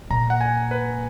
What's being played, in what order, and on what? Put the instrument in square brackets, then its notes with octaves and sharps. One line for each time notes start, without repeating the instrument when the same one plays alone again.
[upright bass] A#2 [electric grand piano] A#5
[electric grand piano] F#5
G#5
B4